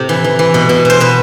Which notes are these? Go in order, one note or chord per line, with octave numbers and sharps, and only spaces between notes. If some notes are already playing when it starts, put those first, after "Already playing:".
Already playing: A2 C3 G4
E3
E3
E3
B2
B2
B2 C5
B2 B4